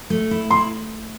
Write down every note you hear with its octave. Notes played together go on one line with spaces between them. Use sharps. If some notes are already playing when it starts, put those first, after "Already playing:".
A3
E4
E4 C6